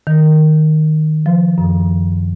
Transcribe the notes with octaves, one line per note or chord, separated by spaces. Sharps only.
D#3
F3
F#2